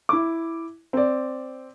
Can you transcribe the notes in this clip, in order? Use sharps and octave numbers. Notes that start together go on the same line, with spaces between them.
E4 D6
C4 D5